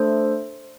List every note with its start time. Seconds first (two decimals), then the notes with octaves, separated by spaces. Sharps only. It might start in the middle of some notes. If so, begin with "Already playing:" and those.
Already playing: A3 D4 A4 C5